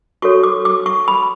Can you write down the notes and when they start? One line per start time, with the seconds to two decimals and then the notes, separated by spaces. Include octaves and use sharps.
0.22 F#4 A4 C#5 C#6
0.43 D6
0.65 D6
0.86 C#6
1.08 B5